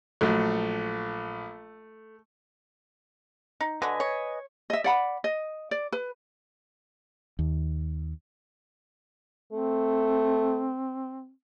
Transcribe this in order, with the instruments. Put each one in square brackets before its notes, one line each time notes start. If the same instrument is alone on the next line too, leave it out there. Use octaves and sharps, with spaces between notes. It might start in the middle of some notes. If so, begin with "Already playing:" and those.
[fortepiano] A#1 F#3 [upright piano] A3
[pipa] D#4
[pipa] D3 F#4 [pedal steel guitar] B4 D#5 G#5
[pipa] C#5
[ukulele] D#5 E5
D5 F#5 B5
D#5
D5
B4
[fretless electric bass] D#2
[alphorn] A3 [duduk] C4